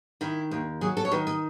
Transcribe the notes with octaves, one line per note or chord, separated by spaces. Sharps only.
D#3 E4
D#2
F#3 G#4
A4
C#5
D#3 B4
D#5